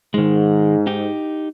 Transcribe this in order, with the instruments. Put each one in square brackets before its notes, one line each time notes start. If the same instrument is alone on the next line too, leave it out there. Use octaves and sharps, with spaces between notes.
[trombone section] G#2 [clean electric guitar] D#3 G#3
[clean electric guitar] D#4 G4